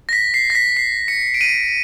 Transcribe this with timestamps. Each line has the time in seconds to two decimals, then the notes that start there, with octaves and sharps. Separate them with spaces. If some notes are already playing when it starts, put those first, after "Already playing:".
0.09 A#6
0.13 B6
0.34 C7
0.50 A#6
0.55 B6
0.77 C7
1.08 C#7
1.34 D7
1.41 D#7